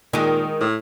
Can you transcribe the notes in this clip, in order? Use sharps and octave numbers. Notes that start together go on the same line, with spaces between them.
A#2 D#3 G#3
A2